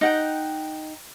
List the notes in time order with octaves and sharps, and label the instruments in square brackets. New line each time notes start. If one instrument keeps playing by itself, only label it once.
[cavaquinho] D#4 F#5 G5